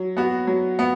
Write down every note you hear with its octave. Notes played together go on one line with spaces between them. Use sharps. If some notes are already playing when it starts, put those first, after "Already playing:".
Already playing: F#3
B3 F#4
F#3
B3